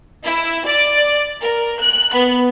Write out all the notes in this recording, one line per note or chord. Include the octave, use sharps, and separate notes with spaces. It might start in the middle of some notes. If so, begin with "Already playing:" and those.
E4
D5
A#4
F#6
B3